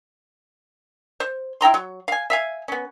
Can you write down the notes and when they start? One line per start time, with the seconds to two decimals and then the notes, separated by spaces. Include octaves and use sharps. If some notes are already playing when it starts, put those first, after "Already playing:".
1.20 C5
1.61 E4 G5 A#5 C6
1.74 F#3
2.08 F5 G#5
2.30 E5 F5 G#5
2.68 B3 C#4